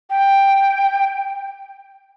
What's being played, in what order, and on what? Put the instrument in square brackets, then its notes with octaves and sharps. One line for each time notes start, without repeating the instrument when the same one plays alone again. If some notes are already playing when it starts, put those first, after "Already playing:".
[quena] G5